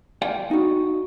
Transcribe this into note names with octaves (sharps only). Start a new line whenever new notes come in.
D5 F5 G5 G#5
D#4 F#4